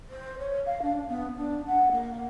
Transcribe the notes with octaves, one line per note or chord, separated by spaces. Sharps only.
C5
C#5
F5
D4
B3
D4
F#5
A#3